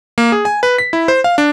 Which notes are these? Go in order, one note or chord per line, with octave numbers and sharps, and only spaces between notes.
A#3
G#4
G#5
B4
B6
E4
C5
F5
D4